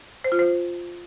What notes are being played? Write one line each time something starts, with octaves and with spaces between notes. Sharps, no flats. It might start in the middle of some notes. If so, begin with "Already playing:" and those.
C5
F4
C5